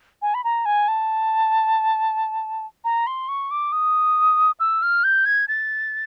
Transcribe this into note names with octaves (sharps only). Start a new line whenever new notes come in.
G#5
B5
A#5
G#5
A5
A#5
C6
C#6
D6
D#6
E6
F6
G6
G#6
A6